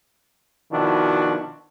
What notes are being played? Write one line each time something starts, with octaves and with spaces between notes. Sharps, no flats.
B2 D#3 F3 D4 E4 F#4